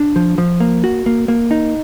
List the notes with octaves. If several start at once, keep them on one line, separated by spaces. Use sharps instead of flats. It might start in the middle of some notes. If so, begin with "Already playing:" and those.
Already playing: D4
F3
F3
A#3
F#4
A#3
A#3
D#4